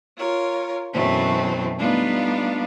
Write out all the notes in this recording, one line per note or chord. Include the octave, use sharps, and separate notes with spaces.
F4 A#4 C#5
F#2 B2 E3 F#3 A3 C4
G3 A3 B3 D4 D#4 F4